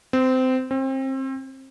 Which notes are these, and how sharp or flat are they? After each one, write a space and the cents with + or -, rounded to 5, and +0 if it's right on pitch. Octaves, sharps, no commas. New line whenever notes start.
C4 -20
C4 +30